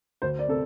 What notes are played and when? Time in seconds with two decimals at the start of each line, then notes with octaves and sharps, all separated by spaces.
0.22 D2 C5
0.39 D5
0.48 C3 A4